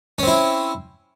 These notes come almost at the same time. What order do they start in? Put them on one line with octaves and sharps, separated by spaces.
C#4 C4 E4